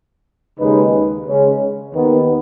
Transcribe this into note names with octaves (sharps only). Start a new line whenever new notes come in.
D#2 C#3 G#3 D#4 B4
C#3 G#3 C#4
D#2 D#3 B3